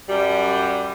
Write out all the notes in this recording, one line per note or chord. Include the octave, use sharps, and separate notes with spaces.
F#2 G3